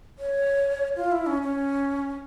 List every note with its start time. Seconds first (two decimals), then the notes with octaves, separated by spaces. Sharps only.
0.19 C#5
0.96 F4
1.12 E4
1.27 C#4
1.42 C#4